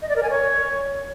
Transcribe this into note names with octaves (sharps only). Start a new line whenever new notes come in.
D#5
D5
A#4
G#5
C#5